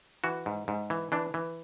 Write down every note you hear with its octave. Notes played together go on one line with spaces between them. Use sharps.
E3 F#4
G#2
G#2
E3
E3 D4
E3